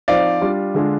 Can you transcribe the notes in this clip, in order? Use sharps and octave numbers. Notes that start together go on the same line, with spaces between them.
F3 C4 D#4 D5 F5
G3 D4 F4
D3 G#3 D4 F4